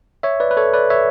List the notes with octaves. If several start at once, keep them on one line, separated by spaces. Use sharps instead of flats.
C#5 E5
B4 D5
B4
A4 C#5
B4 D5
C#5 E5